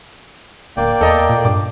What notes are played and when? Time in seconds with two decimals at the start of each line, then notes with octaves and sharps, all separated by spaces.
0.77 D1 A#3 D5 G5
1.01 E2 A4 D#5 A#5
1.29 A#2
1.45 G2 D6